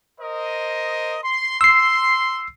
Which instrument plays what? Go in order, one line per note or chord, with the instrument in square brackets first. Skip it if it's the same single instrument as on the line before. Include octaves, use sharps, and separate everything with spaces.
[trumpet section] A#4 C5 D#5
C6
[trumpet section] C6 [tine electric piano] E6 C7